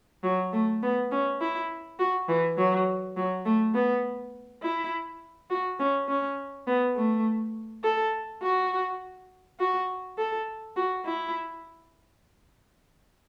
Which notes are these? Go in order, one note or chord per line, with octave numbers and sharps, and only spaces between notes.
F#3
A3
B3
C#4
E4
F#4
E3
F#3
F#3
A3
B3
E4
F#4
C#4
C#4
B3
A3
A4
F#4
F#4
A4
F#4
E4